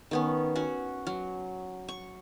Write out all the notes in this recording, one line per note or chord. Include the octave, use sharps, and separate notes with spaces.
D#3 B3 C#4
C#4 F#4
F#3
C#6